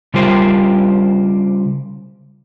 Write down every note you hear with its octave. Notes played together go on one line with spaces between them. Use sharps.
C#3 G3 F4 G4 A#4 C5